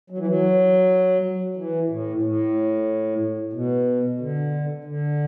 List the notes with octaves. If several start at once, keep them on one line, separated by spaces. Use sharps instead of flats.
F#3
E3
F#3
E3
A2
A2
B2
D3
D3